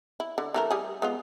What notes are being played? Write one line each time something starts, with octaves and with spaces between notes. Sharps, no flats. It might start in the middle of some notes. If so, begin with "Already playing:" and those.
E4
D3
E3 A3 A#4
G3 G#4
G#3 B3 F4